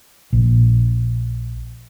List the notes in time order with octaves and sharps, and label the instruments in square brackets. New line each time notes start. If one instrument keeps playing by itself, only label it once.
[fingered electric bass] A#1